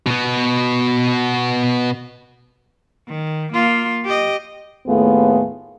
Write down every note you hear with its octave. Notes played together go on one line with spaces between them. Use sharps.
B2 B3
D#3
A#3 F4
G4 D#5
D#2 A2 A3 B3 F4 G#4